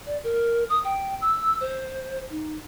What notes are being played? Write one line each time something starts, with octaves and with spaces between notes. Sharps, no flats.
D5
A#4
D#6
G5
E6
C5
D#4